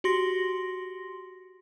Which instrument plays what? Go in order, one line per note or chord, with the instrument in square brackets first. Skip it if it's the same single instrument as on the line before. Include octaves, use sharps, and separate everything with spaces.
[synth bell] F#4 G4 C6 A#6